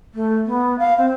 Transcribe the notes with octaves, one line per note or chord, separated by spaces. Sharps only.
A3
B3
F5
C4